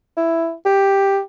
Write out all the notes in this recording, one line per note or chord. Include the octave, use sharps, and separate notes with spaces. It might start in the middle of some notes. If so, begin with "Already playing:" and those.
E4
G4